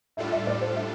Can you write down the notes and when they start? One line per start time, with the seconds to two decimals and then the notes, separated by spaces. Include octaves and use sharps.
0.17 A2 G3 D4 F4 A4 E5
0.32 E5
0.47 D5
0.61 C5
0.76 E5